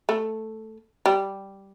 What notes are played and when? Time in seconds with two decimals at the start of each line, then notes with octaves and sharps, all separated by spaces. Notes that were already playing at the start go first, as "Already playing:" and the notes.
0.09 A3
1.06 G3